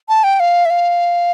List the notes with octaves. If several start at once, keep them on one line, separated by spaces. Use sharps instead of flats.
A5
G5
F5
E5
F5